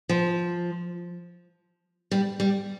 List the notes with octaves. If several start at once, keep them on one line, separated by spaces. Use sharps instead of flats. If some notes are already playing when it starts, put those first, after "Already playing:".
F3
G3
G3